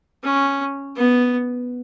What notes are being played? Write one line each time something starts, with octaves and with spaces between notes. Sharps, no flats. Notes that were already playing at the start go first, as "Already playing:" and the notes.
C#4
B3